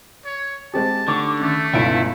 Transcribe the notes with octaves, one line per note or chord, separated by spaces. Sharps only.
C#5
G#3 C4 G4 A5
D3 A3 D#4 G4 C#6 D6
D#3 A3 C#4
G1 C#2 B2 B3 D#4 E4 D7